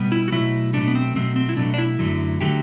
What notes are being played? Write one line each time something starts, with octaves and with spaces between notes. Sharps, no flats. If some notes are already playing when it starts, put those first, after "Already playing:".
Already playing: B2 G3 B3
E4
F#4
B2 F#3 A3 E4
B2 F#3 A3 D4
B3
C4
B2 F#3 A3 C4
C4
E4
B2 F#3 A3 D4
D4
E4
F#2 D3 F#3 A3
D3 F#3 A3 G4